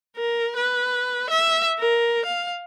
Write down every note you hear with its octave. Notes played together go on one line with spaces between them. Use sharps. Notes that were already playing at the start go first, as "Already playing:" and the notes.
A#4
B4
E5
A#4
F5